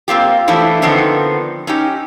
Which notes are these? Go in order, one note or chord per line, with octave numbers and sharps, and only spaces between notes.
A#3 C4 F4 G4
E3 F3 A3 D4 E4
D3 D#3 F3 B3 C4 D#4
C#4 D#4 G4